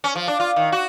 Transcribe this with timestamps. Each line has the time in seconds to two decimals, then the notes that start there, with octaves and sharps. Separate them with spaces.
0.04 C#4
0.16 F3
0.28 D4
0.40 F4
0.56 D#3
0.72 F#4